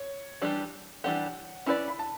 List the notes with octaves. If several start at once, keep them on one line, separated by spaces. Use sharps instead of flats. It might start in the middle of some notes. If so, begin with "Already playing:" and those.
Already playing: C#5
E3 G3 D4 G4
E3 G3 D4 G4 F#5
C#4 E4 B4 D5 B5
B5
A5